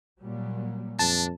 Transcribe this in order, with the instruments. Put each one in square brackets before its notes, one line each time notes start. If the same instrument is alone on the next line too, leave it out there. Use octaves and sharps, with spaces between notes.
[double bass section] A#2 F#3 G3
[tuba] F2 [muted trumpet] D4 [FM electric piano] A5